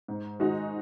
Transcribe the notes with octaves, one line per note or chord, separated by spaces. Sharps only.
G#2
D#3 G#3 D#4 F#4